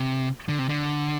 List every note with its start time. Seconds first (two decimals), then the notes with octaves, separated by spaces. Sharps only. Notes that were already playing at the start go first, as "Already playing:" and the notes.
Already playing: C3
0.49 D3
0.59 C3
0.69 D3